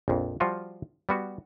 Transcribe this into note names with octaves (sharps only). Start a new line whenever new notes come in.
A#1 F2
F3 G3 F4 F#4
G3 B3 F#4